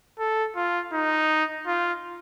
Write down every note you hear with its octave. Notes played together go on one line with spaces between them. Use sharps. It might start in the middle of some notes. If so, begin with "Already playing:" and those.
A4
F4
D#4
F4